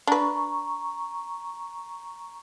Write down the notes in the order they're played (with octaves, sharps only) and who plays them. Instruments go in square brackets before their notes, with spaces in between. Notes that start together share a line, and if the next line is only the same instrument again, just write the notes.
[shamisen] D4 B4 [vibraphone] A#5 C#6